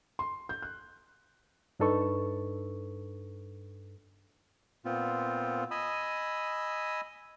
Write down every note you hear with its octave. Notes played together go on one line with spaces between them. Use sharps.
C6
G6
F#6
G2 D4 D#4 A4 B4 C#6
A#2 B3 C4 F4
D#5 G#5 B5 D#6 E6